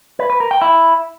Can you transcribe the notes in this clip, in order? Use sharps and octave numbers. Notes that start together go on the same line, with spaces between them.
B4
B4
A#4
G5
E4